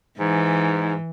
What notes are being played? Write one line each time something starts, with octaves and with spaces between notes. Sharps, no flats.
G#2 E3